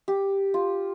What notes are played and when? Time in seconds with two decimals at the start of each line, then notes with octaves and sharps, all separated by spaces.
0.08 G4
0.54 F4